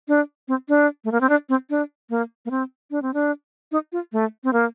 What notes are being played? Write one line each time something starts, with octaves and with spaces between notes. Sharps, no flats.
D4
C4
D4
A3
A#3
C4
D4
C4
D4
A#3
A#3
C4
D4
C4
D4
D#4
F4
A3
C4
A#3